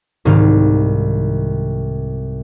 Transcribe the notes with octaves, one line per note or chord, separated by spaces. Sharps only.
C2 G#2 D#3 F5